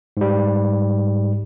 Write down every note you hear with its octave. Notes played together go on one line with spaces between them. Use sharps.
G#2 G3